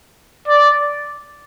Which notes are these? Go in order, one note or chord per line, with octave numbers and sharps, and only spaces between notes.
D5